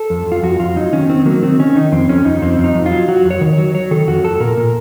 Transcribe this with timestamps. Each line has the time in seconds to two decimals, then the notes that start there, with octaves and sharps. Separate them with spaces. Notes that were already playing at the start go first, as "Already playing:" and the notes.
Already playing: A4
0.10 F2
0.26 F2
0.32 F4
0.43 F2 F#4
0.59 F2 F4
0.76 F#3 D#4
0.92 D#3 C#4
1.09 D#3 C4
1.26 F#3 A#3
1.43 D#3 C4
1.59 D#3 C#4
1.75 D#3 D#4
1.92 F2 C4
2.09 F2 C#4
2.25 F2 D#4
2.42 F2 C4
2.58 F2
2.64 D#4
2.75 F2
2.86 F4
2.91 F#3
3.08 F#3 F#4
3.25 F2
3.31 C#5
3.41 D#3
3.53 C#5
3.58 F#3
3.74 F#3 C#5
3.91 D#3 A4
4.08 F2 F#4
4.24 F2 A4
4.40 A#2 A#4
4.57 A#2